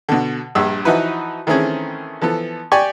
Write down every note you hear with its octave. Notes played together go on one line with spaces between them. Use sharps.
B2 D3
A#1 G2 E6
E3 F3 D#4 E4 F#4 B4
D#3 E3 A3 C4 C#4 G#4
E3 F3 B3 A4
G4 D5 G5 G#5 C#6